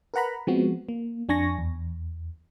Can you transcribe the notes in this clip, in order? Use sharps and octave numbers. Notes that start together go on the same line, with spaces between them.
A#4 B4 F#5 A#5 B5
F3 G#3 B3 C4 F#4
A#3
F2 D4 G#5 C#6 A#6
E2